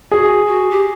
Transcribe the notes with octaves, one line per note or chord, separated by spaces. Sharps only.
F#4 G#4
F#4
G4